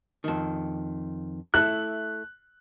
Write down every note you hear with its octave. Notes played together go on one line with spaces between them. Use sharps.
F2 D#3
A3 E4 F#6